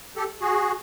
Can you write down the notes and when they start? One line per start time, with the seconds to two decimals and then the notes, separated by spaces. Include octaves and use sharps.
0.16 G4 A4
0.41 F#4 G#4